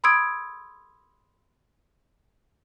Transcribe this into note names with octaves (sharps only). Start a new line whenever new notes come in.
B5 C6 D#6 E6 G#6 D7